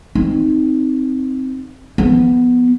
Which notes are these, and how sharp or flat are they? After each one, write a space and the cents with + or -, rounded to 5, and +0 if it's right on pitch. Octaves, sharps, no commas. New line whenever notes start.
C4 +0 D#4 +0
F3 +0 B3 +0